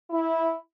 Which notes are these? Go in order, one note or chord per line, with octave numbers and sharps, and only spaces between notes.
E4